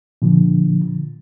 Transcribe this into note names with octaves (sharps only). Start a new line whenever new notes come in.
A#2 D3 F3